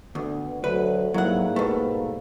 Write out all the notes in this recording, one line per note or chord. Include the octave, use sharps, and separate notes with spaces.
D2 D3 B3
D2 F#3 B4
G#2 F#3 G3 A#3 E4 F#5
B2 A3 B4